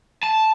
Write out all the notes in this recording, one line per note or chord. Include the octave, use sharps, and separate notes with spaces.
A5